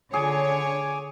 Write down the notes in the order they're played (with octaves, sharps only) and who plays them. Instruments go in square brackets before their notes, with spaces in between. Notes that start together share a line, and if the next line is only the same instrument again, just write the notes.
[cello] D3 [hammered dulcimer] G#4 [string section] C#5 [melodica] G#5 D6